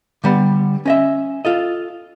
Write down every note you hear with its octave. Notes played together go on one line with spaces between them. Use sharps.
D3 G3 B3
C#4 D#5 E5
F4 A4 D#5